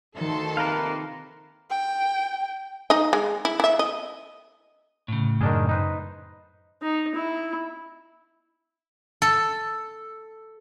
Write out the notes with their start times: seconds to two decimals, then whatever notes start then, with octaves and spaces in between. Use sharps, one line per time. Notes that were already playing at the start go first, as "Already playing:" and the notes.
0.15 D2 D#3 A4 C6
0.57 F2 C3 A#3 A#4 B4 F5
1.70 G5
2.90 D#4 D#5
3.13 G#3
3.45 E4
3.60 E4 E5
3.79 D#5
5.08 A2 C#3
5.41 F#2 D#3 D4 G#4
5.69 D#4 B4 C5
6.82 D#4
7.15 E4
9.22 A4